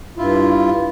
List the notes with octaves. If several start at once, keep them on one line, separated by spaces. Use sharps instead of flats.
G2 E4 F4